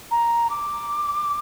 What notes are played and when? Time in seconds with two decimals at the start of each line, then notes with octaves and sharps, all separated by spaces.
0.11 A#5
0.50 D6